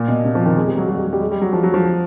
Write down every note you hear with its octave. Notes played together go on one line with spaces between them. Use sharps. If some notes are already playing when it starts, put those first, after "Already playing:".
Already playing: A#2
B2
C3
F3
D#3
G#3
G3
F#3
F#3
G3
F#3
G3
G#3
G3
F#3
F3
F#3
F3